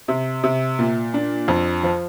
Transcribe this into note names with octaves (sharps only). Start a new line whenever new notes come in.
C3
C3
A#2
D4
F2
F3